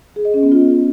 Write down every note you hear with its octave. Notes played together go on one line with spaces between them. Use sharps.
G#4
D#5
C#4
B3
F4